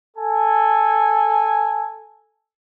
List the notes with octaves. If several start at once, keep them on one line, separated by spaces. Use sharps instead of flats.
A4 G#5